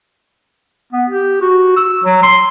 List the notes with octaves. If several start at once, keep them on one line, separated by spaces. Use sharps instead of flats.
B3
G4
F#4
E6
F#3
C6